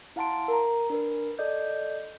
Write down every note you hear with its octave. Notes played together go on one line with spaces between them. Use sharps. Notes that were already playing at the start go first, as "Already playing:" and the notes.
E4 F5 F#5 A5 C6 D7
A#4 A#5
D4 A#4 B4
A4 D5 D#5 G6